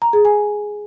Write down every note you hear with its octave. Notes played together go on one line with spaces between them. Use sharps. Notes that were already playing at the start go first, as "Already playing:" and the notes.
A#5
G#4
G#5